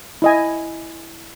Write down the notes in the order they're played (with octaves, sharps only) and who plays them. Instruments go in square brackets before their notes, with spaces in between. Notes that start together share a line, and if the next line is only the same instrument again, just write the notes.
[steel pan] E4 D#5 G#5